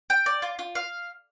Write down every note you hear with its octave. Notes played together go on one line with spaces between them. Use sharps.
G5
D5
F4
F4
F5